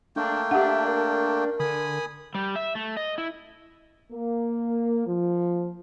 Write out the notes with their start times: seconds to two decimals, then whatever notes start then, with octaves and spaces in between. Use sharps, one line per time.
0.16 A3 A#3 D4 G5
0.51 D4 G4 E5 F#5
0.87 A#4
1.60 D3 G#5 B5 D#6
2.35 G3
2.56 E5
2.75 A3
2.97 D#5
3.18 E4
4.12 A#3
5.07 F3